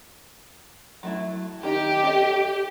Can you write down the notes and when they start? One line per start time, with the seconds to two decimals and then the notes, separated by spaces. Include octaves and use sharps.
1.03 F#3 A3 E4
1.63 D#3 D#4 G4
2.03 D4 A4 D#5